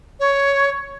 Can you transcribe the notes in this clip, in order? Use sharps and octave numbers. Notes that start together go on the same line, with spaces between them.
C#5